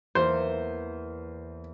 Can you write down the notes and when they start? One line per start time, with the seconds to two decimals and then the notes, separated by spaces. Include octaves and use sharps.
0.15 E2 A#3 C5